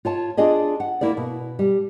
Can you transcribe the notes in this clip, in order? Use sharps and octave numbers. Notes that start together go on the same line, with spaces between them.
F4 C#5 A5
D4 F4 G#4 D5 D#5
F#5
A#3 E4 A#4 D5
B2
G3